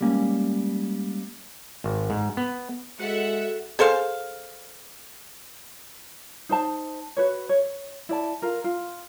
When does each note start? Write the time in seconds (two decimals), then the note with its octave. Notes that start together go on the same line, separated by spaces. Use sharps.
0.01 G3 G#3 A#3 C#4
1.84 G#1
2.10 G#2
2.37 B3
3.00 G#3 F#4 A4 E5 F#5
3.79 G#4 A4 C5 F5
6.49 D#4 C5 A5
7.17 F#4 B4 C#5
7.49 C#5
8.09 E4 D5 A5
8.42 F4 A#4
8.64 F4